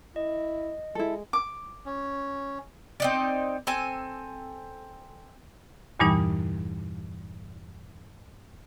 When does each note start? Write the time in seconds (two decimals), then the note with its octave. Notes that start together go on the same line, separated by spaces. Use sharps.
0.16 E4 D#5
0.95 G#3 E4 A4
1.33 D6
1.86 C#4
3.00 C4 D#4 D5
3.67 C4 A4 G#5
6.00 E2 G2 A#2 E3 G3 D#4